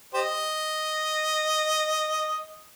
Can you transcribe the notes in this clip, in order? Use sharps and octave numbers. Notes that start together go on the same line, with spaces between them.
G4 C5 D#5